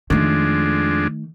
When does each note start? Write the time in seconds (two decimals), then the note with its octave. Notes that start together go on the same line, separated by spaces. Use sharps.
0.10 F2 D#3 G#3 A3 D4